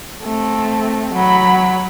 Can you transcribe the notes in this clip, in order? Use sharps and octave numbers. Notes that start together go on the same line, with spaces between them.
A3 C4
F#3 B5